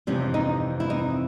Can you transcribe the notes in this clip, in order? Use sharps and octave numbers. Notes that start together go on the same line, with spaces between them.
F2 C3 E3 C#4
D#4
E4
D#4